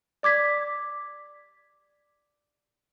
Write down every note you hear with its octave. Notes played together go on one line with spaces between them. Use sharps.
D5 D6 G#6 B6